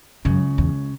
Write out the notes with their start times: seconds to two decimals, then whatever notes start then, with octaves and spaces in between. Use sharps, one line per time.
0.25 C#2 F#2 C#3
0.58 E2